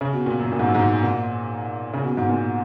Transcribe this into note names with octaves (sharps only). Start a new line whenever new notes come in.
C#3
B2
A#2
F#2
A#2
G#2
F#2
G#2
A#2
C#3
B2
G#2
A#2